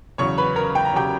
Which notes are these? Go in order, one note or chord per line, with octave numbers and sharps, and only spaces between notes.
E2 C#3 F#3 C#5 C#6
B4 B5
A#4 A#5
G5
A#5
C#3 F#3 G4 G5